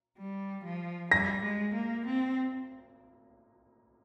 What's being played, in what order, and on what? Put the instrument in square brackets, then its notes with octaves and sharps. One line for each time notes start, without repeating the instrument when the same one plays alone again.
[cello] G3
F3
[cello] G3 [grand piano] A#6
[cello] G#3
A#3
C4